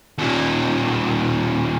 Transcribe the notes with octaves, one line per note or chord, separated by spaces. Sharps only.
D#2 A#2